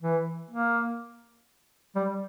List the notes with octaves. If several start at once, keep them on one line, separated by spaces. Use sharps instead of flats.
E3
A#3
G3